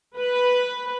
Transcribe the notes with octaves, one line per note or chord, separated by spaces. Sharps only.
B4